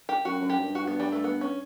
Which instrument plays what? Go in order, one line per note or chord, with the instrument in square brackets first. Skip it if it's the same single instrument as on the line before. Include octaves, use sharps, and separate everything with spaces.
[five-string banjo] G4
[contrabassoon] F#2 [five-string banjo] F#4
[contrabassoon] F#2
[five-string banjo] G4
[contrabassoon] G2
[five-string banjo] F#4
B3
G3
A3
B3
C#4